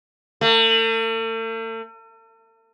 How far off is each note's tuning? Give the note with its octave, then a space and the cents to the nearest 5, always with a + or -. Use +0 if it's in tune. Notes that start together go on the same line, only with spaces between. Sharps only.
A3 +45